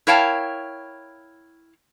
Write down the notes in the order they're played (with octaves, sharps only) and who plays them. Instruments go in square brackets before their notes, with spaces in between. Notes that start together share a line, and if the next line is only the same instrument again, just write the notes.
[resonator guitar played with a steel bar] E4 A#4 C#5 F5 G5 A5